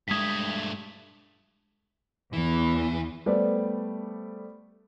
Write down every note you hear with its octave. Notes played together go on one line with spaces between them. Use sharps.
G2 G#3 A3 B6
E2 E3
G3 A3 B3 B4 C5 D5